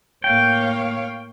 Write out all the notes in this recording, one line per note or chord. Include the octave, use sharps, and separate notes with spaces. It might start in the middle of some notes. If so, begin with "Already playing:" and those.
A2 A#3 C#5 F5 G5